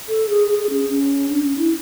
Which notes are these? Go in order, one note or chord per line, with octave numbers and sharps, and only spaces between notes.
A4
G#4
G#4
C#4
C#4
D4
C#4
E4